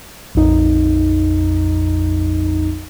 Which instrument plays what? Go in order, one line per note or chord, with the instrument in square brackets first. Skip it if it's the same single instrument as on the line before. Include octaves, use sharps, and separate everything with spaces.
[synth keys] A#1 F2 D#4